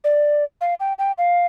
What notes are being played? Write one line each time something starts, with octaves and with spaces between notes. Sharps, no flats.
D5
F5
G5
G5
F5